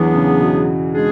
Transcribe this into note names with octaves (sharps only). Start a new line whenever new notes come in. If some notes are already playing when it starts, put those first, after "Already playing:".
Already playing: E2 E3 F#3 B3 D4 G#4
C#3
B2
G#3 D4 G#4